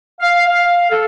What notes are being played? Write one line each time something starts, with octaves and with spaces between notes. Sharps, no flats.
F5
F5
A4